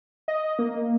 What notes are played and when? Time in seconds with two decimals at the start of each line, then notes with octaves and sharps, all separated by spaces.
0.28 D#5
0.59 A#3